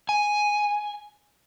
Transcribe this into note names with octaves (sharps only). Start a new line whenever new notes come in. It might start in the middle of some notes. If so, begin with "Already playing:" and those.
G#5